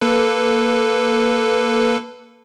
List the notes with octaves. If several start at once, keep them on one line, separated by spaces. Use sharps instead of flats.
A#3 A4 B4